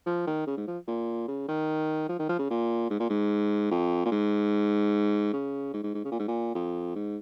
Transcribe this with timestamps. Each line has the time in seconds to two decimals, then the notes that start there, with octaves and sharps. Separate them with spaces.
0.06 F3
0.27 D#3
0.47 C#3
0.57 G#2
0.68 F3
0.88 A#2
1.28 C#3
1.48 D#3
2.09 F3
2.19 D#3
2.29 F3
2.39 C#3
2.50 A#2
2.90 G#2
3.00 A#2
3.10 G#2
3.71 F2
4.06 A#2
4.11 G#2
5.33 C#3
5.74 G#2
5.84 G#2
5.94 G#2
6.05 C#3
6.12 A#2
6.19 G#2
6.28 A#2
6.55 F2
6.96 G#2